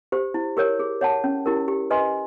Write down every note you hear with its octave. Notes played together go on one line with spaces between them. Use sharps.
G4 C5
E4
G4 A#4 C#5
G#4
C#5 F#5 A5
C#4
E4 G4 A#4
G4
B4 D#5 G#5 C6